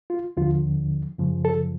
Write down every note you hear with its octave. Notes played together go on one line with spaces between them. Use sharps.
F4
D#2 D3 F3 F4
F#2 C#3 F3
A4